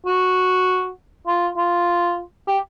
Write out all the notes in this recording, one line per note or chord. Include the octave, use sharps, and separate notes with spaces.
F#4
F4
F4
G4